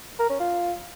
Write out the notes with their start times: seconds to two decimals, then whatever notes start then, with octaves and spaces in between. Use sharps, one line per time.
0.19 A#4
0.30 C#4
0.40 F4